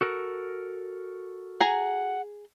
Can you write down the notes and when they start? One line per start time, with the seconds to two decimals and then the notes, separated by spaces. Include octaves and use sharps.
0.01 F#4 A4 A#4
1.60 G#4 F#5 G#5 A#5